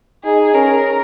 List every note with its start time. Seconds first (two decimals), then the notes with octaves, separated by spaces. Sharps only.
0.24 D#4 G#4
0.54 C#4 A#4